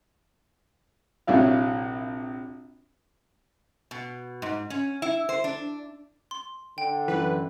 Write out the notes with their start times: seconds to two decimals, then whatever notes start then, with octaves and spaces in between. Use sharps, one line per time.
1.27 A#1 C3 F#3 E4 F5
3.91 B2
4.42 G#2
4.70 C#4
5.02 E4
5.29 C5
5.44 D4
6.31 C6
6.78 D3 G5
7.08 F#2 E3 B4